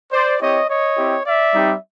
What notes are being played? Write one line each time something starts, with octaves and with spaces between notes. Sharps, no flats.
C5 D5
C4 E4 G4 C#5 D#5
C#5 D#5
C4 E4 G4
D5 E5
G3 C4 D#4 G4